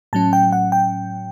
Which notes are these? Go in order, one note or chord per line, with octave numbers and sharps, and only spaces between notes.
A2 F#3 C#4 A5
G5
F#5
G5